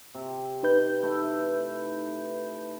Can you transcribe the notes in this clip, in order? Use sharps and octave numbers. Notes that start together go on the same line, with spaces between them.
C3
D#4 B4 G6
A3 E4